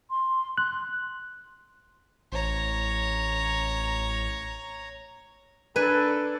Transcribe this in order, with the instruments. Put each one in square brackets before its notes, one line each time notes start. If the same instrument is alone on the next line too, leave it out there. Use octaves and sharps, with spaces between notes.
[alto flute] C6
[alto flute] C6 [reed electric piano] F#6
[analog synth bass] A1 [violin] C#5 A#5
[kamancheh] D4 A4 [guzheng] B4 G#5